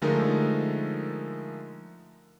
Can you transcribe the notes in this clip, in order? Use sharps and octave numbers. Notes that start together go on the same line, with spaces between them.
D3 F3 G#3 A3 D#4 A#4